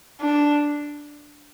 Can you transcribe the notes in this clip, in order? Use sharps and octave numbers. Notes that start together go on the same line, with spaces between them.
D4